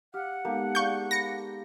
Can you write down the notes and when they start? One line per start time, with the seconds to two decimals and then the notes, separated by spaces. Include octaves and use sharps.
0.14 G4 F5 F#5 F6
0.45 G#3 A#3 B3 D#4 G4 A4
0.75 G#4 D5 F5 C#6 G6
1.11 B5 A#6 C#7